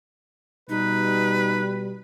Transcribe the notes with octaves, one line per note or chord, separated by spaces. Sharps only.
B2 G3 D#4 B4